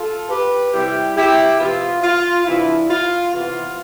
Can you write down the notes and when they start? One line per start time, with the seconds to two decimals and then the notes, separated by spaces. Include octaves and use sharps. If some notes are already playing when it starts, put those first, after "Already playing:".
Already playing: F4 A4
0.29 G4 B4
0.72 C3 G3 C4 E4 G4
1.16 E4 G4
1.60 C3 F3 B3 F4
2.03 F4
2.46 C3 E3 B3 D4 E4
2.89 F4
3.33 C3 E3 B3 F4